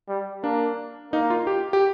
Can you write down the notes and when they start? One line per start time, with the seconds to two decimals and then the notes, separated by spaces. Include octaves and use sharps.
0.08 G3
0.44 A#3 D4
1.13 A#3 D#4
1.30 F4
1.47 G4
1.73 G4